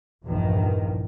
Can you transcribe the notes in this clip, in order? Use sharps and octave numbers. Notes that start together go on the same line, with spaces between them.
A#1 E2 G2 A#2 D#3